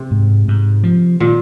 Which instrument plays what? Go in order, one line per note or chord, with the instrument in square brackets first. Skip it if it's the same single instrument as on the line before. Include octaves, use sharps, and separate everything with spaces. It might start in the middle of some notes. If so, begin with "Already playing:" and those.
Already playing: [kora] C3
[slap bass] G#2
G#2
F3
[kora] A#2 [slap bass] D#3